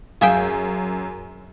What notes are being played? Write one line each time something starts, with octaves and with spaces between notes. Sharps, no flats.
F#2 G#4 E5 F5 G5